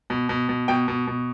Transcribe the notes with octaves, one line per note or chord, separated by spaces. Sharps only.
B2
B2
B2
B2 G5
B2
B2